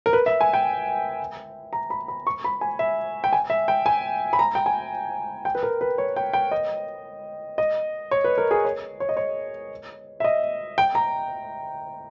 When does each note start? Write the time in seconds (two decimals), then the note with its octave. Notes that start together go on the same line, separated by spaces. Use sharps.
0.06 A#4
0.13 B4
0.26 E5
0.41 G#5
0.54 G5
1.73 A#5
1.90 B5
2.08 B5
2.27 C#6
2.44 B5
2.61 G#5
2.79 E5
3.24 G5
3.33 G#5
3.50 E5
3.68 G5
3.86 G#5
4.33 B5
4.39 A#5
4.55 G5
4.66 G#5
5.45 G5
5.55 B4
5.63 A#4
5.81 B4
5.98 C#5
6.16 G5
6.33 G5
6.51 D#5
7.58 D#5
8.11 C#5
8.24 B4
8.38 A#4
8.51 G#4
8.65 C#5
9.00 C#5
9.09 D#5
9.17 C#5
10.20 E5
10.24 D#5
10.78 G5
10.95 A#5